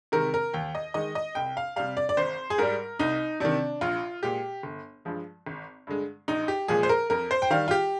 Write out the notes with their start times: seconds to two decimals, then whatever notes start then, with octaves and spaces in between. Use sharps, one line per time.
0.12 C3 D#3 G#3 A#4
0.34 A#4
0.53 D#2 G5
0.75 D#5
0.94 D#3 G#3 D#5
1.15 D#5
1.35 C2 G5
1.57 F5
1.76 C3 G3 F5
1.97 D5
2.09 D5
2.17 G#1 C5
2.50 G#4
2.58 G#2 G3 A#4
2.99 C2 D#4
3.40 C3 D#3 D4
3.81 A#1 F4
4.22 A#2 G#3 G4
4.63 G1
5.05 G2 F3 G#3
5.46 G#1
5.87 G2 D3 G#3
6.28 A#1 D#4
6.48 G4
6.68 A#2 F3 G#3 G#4
6.83 C5
6.89 A#4
7.10 F2 A#4
7.31 C5
7.42 G5
7.50 D#3 G3 F5
7.68 F4
7.71 G4